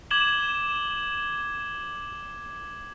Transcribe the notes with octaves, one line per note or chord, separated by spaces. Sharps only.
D6 G#6 E7 F#7 G7